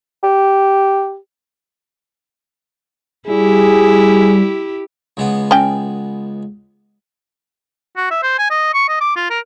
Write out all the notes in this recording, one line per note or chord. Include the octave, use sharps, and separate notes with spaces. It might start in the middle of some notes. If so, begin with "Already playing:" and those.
G4
G3 E4 G4 G#4
C#2 G#3 B3
C#4 G5
F#4
E5
C5
G#5
D#5
C#6
D#5
D6
F4
A#4